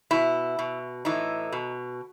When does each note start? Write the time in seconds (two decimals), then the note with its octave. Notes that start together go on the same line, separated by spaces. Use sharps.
0.11 B2 E4
0.59 B2
1.05 A2 E3 D#4
1.52 B2